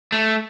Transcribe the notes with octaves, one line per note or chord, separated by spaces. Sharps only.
A3